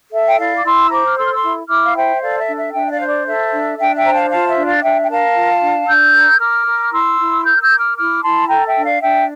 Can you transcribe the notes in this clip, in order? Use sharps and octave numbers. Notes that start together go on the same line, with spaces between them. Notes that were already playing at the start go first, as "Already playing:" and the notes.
A4 E5
G5
E4 D5 F5
D6
E4 C6 E6
C5 A#5 D6
F6
A4 C6 E6
F6
C6 E6
E4
E4 D6 F6
F5
C5 E5 G5
A4 D5 F5
E5
D4
E5
D4 E5 G5
E5
D5 F5
C5
D5
A4 E5
D4
D4 E5 G5
E5 G5
C5 A#5
F5 A5
F4 F5 A5
E5
D4
D5 F5
D4 E5 G5
G5
A#4 F5 A5
F4
D4
D4 E6 G6
A#4
A#4 D6 F6
A#4
E4 C6 E6
E4
A#4 E6 G6
F6
E6 G6
A#4
D6 F6
E4 D6 F6
E4 A5 C6
A4 G5 A#5
E5 G5
D4
D5 F5
D4 E5 G5